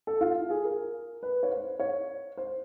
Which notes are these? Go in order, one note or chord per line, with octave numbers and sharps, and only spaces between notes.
A4
F4
G#4
A#4
B4
C#5
C5
C#5
C5